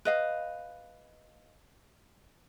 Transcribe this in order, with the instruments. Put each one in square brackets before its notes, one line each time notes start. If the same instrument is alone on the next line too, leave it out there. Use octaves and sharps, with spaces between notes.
[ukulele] B4 D#5 F5